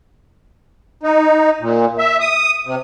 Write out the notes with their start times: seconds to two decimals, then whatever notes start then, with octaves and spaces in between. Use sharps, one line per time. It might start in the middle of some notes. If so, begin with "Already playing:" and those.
1.03 D#4
1.60 A#2
1.98 E5
2.20 D#6
2.66 C3